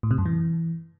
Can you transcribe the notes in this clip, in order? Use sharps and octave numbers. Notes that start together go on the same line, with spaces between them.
A2
C3
F#2
E3